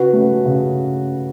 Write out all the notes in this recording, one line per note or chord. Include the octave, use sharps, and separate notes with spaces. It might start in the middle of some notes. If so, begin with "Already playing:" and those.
Already playing: C#3 F#4 B4
A3 C#4
C#3